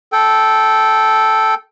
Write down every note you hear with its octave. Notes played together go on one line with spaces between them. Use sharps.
A4 G5